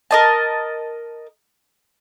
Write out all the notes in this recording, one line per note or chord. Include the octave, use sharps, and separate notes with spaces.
A#4 D#5 A5